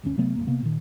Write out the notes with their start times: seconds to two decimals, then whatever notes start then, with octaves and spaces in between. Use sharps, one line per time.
0.03 G1 D2 C#4
0.17 C3 F#3 A3 B3
0.35 G1 C2 A#3
0.47 C3 A#3 B3
0.62 A#2 D#3